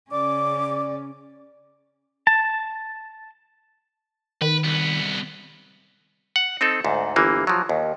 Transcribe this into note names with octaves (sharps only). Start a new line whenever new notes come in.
C#3 C#4 D5 D6
A5
D#3 B4
C2 B3
F#5
C4 D#4 A4
D2 G#2
G1 E3 A#3
F3 F#3
D#2